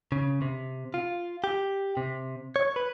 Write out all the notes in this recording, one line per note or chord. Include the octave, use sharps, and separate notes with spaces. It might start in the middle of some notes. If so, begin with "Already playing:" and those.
C#3
C3
F4
G4
C3
C#5
B4